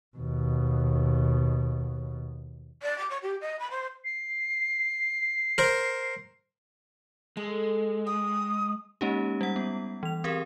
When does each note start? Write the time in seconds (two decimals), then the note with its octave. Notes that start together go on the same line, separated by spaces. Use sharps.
0.17 D#2 B2
2.83 D5
2.98 D6
3.10 C#5
3.22 G4
3.41 D#5
3.59 B5
3.71 C5
4.05 C7
5.58 A#4 C5
7.37 G#3 A4
8.07 G5 D#6
9.01 G#3 A#3 C#4 D#4 G4
9.41 G3 F#5
9.56 B3
10.03 E3 F7
10.24 C4 G4 G#4 A#4